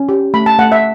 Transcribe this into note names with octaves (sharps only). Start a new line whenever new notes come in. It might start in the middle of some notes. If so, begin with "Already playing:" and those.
Already playing: C#4
G4
A3 B5
A5
A3 F#5
E5